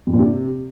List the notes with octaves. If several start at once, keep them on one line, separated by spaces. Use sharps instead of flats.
F2
A#2
C3